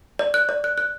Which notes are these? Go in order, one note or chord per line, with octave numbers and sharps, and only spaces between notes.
D5
F#6
D5
F#6
F#6